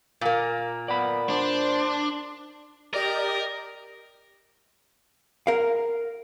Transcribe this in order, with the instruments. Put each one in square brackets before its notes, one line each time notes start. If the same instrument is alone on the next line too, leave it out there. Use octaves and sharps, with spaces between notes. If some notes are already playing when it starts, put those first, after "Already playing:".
[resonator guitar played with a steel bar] A#2 A#3
[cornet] B3 [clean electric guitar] D5 F#5 B5
[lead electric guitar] D4 [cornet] C5
[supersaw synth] G4 D5 D#5 [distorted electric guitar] A#4
[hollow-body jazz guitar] A#4 F5